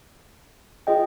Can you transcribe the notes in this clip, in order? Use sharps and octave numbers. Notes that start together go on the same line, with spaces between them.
F4 G#4 D#5 G5